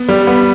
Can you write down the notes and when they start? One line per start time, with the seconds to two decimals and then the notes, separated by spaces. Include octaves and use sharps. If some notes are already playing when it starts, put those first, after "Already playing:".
Already playing: B3
0.09 G3
0.27 B3